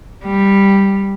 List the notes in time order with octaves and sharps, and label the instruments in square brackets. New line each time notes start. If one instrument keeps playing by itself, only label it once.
[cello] G3